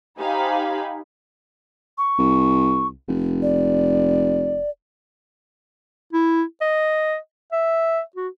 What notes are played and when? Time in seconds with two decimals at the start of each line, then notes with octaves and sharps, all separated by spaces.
0.18 D#4 G4 C5 F5 G#5 B5
1.98 C#6
2.18 C2
3.08 F1
3.42 D5
6.13 E4
6.61 D#5
7.52 E5
8.16 F#4